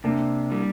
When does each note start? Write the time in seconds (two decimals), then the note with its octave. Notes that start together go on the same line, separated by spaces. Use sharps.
0.04 C3 A#3 D4
0.51 G3